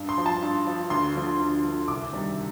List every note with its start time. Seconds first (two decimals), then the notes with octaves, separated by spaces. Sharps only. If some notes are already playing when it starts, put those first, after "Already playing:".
Already playing: G2
0.09 C6
0.18 F3
0.26 A5
0.42 G2
0.67 F3
0.90 D2 C6
1.15 D3 F3
1.40 D2
1.64 D3 F3
1.88 C2 D6
2.13 C3 D#3 G3